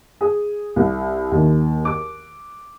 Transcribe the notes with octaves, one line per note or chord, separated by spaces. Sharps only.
G#4
C2
D#2
D6